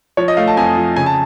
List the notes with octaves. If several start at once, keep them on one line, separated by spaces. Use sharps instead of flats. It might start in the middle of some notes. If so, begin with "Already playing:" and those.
F3 C#5
D#5
A3 F5
A5
F2 G#5
F3
C#3 G#5
A5